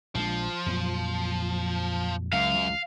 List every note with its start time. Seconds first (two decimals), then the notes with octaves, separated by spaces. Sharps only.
0.15 A#1 F3 G#3 D4
0.66 F2 A#2 F#3
2.33 C#2 F#2 F5
2.54 C#2